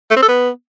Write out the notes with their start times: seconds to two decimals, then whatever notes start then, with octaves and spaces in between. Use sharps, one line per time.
0.11 A3
0.17 C4
0.23 A4
0.29 B3